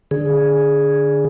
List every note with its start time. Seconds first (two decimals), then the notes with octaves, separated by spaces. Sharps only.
0.11 D3 G#4